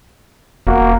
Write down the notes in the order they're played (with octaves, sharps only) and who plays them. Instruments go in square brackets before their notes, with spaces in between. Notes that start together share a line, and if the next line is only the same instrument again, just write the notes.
[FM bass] E1 [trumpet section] A#3 F#4